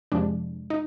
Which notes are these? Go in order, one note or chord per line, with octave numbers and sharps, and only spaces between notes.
F2 C3 F3 G#3 D4
D#4